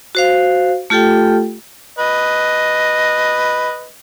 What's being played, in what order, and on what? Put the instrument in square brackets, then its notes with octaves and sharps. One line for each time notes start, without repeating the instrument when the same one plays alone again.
[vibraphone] F#4 C5 F5
A3 F4 G4 A4 G5
[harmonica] B4 D#5